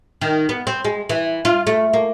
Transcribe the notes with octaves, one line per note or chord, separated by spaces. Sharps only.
D#3
B3
C4
G#3
E3
F4
A3
A#3